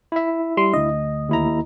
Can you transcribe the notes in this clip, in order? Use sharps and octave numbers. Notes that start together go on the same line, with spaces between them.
E4 E5
G3 C6
D2 D4 D#5
D#2 E4 A#5